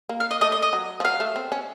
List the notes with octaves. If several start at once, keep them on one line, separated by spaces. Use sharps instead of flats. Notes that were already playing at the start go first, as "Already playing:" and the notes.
A#3
F5
D#5
A3 D#5
D#5
D#5
F#3
F3
F#3 F5
A3
C4
C#4